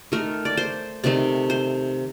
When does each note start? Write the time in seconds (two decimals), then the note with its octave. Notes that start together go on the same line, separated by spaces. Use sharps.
0.12 D#3 A3 A#4
0.45 D5
0.57 C5
1.04 C3 D#3 A3 D5
1.50 C5